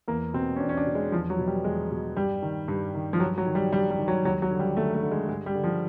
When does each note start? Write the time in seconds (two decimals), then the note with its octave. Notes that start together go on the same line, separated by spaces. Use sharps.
0.08 E2 A#3
0.34 B2 C4
0.56 C#4
0.60 E2 D4
0.69 C#4
0.77 D4
0.86 B2
0.95 G#3
1.12 E2 F3
1.30 F#3
1.38 B2
1.47 G3
1.64 E2 G#3
1.91 B2
2.16 G2 G3
2.42 D#3
2.68 G2
2.94 D#3
3.13 F3
3.20 G2 F#3
3.38 F#3
3.46 D#3
3.55 G3
3.72 G2 G3
3.90 G3
3.99 D#3
4.08 F#3
4.25 D#2 F#3
4.42 F#3
4.51 D3
4.59 G3
4.77 D#2 A3
4.94 A3
5.03 D3
5.11 G#3
5.29 G2 G#3
5.46 G3
5.55 D3
5.64 F3